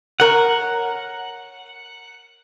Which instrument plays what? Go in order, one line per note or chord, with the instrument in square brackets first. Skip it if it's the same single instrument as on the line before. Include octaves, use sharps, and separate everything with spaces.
[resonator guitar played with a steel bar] A#4 C#5 [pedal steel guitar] F#5